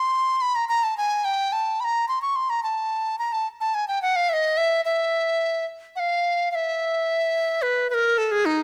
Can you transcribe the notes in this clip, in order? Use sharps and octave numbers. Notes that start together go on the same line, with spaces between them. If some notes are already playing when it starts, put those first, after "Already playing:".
Already playing: C6
B5
A#5
A#5
A5
G#5
G5
A5
B5
A#5
C6
C#6
C6
A#5
A5
A#5
A5
A5
G#5
G5
F#5
F5
E5
D#5
E5
E5
F#5
F5
F5
E5
B4
B4
A#4
A4
G#4
D#4